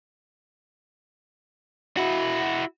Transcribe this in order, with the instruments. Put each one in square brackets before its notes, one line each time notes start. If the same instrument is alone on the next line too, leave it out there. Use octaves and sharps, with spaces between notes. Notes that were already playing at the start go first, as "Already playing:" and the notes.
[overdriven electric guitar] E4 F#4